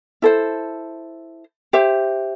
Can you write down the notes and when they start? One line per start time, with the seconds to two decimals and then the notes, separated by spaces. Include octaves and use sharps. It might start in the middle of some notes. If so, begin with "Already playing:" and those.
0.22 E4 A4 C5
1.73 G4 C5 E5